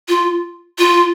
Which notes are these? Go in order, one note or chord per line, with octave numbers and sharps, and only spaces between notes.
F4
F4